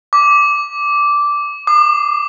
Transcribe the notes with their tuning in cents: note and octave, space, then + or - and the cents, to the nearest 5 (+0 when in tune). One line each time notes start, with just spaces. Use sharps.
D6 -10
D6 +45